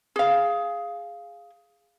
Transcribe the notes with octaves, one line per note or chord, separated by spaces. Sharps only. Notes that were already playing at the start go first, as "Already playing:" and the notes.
G#4 F5